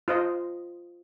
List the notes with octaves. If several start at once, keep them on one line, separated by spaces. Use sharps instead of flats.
F4 C5 D#5